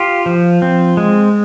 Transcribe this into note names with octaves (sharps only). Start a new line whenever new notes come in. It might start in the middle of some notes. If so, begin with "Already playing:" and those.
Already playing: F4 G4
F3
C4
G#3